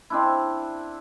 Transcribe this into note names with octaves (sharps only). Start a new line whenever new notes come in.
C4 D4 E4